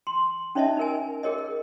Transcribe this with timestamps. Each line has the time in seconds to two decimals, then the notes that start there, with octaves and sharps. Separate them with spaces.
0.07 C6
0.55 C#4 D#4 C#5 D#5 E5 A5
0.77 D#4 A#4 G#5
1.23 G#4 A#4 C#5 D#5
1.39 A#4